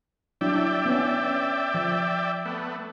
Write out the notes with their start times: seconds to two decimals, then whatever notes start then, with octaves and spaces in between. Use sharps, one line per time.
0.41 F#3 D4 E4 D5 E5 G5
0.86 B3 C#4
1.74 F3
2.45 A3 B3